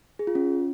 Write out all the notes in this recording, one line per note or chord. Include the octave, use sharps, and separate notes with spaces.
G#4
F4
C#4